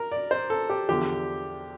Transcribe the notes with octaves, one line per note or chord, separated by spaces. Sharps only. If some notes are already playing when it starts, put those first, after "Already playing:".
Already playing: A#4
D5
C5
A4
G4
E2 D3 F3 G4